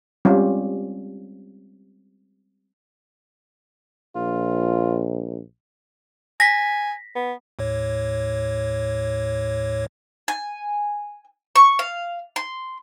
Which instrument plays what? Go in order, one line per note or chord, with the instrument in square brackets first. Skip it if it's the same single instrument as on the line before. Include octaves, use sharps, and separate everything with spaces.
[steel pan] G3 G#3 C4 C#4 F4 G4
[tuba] A#1 [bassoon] F4
[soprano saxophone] G#5 [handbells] A#6 B6
[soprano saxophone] B3
[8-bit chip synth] D#2 A2 C#5
[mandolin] G#5
C#6
F5
C6